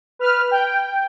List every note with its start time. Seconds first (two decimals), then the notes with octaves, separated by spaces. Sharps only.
0.19 B4 F6
0.51 G5